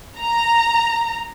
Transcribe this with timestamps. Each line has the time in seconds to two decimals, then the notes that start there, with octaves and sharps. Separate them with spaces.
0.19 A#5